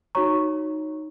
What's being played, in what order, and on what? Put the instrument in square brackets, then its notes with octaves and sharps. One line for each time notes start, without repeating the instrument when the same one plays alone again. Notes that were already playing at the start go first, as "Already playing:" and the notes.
[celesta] D#4 F#4 C#5 A#5 C#6